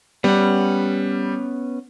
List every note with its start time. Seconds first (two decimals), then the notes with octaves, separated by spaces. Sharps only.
0.24 G3 B3 C#4 F#5